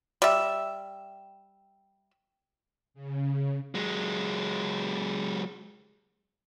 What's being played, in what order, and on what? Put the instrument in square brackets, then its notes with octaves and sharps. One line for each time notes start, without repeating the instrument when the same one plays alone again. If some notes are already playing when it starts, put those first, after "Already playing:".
[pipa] G3 E5
[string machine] C#3
[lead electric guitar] F#3 G#3